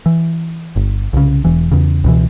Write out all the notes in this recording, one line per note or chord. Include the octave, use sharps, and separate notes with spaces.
E3
G1
C2 C#3
E1 E3
E2 C#3
C#2 B2 E3